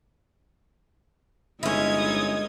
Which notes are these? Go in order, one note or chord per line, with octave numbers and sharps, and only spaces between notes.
G1 G#3 C#4 D#4 E4 D#6 G#6